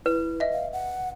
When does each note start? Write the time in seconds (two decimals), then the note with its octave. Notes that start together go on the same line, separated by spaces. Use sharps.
0.06 E4 B4
0.40 D#5 E5
0.53 F5
0.73 F#5